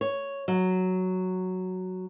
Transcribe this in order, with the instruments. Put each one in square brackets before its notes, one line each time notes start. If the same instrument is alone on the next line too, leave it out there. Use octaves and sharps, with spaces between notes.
[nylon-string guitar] C#5
F#3